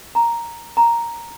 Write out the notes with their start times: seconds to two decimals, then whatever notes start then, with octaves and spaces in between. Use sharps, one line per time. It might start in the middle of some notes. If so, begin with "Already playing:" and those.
0.15 A#5
0.77 A#5